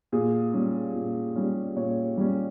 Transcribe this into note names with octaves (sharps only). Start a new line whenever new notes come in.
A#2 G#4
G3 C#4
A#2
G3 C#4
A#2 C#5
G3 C#4